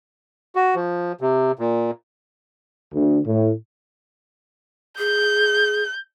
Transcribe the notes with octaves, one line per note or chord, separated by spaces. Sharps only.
F#4
F3
C3
A#2
D2
A2
G#4 G6